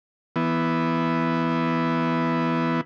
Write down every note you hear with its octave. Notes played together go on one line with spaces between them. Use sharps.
E3 B3